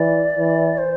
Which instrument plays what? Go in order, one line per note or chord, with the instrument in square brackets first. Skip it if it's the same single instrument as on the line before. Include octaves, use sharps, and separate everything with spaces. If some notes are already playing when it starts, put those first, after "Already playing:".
Already playing: [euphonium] E3 [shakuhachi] D5
[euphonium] E3
[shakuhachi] C5